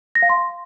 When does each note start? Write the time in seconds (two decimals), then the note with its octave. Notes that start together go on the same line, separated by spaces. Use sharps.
0.15 A#6
0.22 F5
0.29 C6